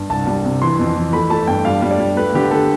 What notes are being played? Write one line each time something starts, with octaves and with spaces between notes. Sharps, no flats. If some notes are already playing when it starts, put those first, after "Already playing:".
Already playing: G2
C2 A5
G3
C3
E3 C6
F2
E3
A3 B5
A3 A5
G2 G5
G3 F5
G3
D5
G3
A3 B4
D3 G4
A3 A4